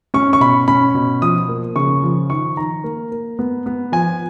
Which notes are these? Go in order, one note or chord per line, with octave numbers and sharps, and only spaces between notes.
C#4 C#6
C#6
B2 B5
C#4 B5
B2
F3 D#6
A#3
C#3 C#6
F3
D#3 C#6
D#3 A#5
A#3
A#3
B3
B3
F3 G#5